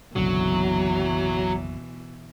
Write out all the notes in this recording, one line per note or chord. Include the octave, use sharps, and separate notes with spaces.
F#1 B1 B2 D3 E3 F#3